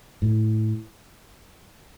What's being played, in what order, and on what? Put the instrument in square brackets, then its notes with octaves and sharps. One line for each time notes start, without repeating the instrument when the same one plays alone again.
[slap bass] A2